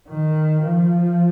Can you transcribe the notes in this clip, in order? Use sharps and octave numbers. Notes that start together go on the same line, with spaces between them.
D#3
F3